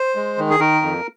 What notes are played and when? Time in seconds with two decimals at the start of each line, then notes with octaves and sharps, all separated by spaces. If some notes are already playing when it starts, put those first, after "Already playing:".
Already playing: C5
0.15 G#3
0.38 D#3
0.50 G#4
0.60 D#3 A#4
0.82 F2